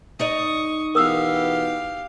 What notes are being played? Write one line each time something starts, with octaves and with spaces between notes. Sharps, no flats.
D#4 D5 D#5 C#6 D#6
E2 B2 B3 G4 A#4 F5 D#6 E6